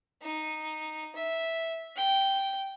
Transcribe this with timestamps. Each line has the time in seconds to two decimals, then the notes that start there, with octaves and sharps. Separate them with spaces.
0.22 D#4
1.15 E5
1.96 G5